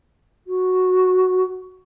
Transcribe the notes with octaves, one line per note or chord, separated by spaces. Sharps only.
F#4